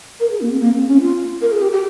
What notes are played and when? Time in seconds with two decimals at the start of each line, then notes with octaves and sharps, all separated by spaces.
0.20 A#4
0.31 G#4
0.41 A#3
0.50 C4
0.60 A#3
0.74 C4
0.88 C#4
1.01 F4
1.41 A#4
1.52 G#4
1.61 G4
1.72 G4